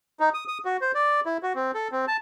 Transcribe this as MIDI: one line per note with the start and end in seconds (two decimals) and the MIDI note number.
0.20 0.29 63
0.34 0.44 87
0.48 0.58 87
0.65 0.77 66
0.81 0.92 72
0.95 1.20 74
1.26 1.38 64
1.43 1.53 66
1.55 1.71 60
1.74 1.88 69
1.92 2.05 60
2.08 2.17 81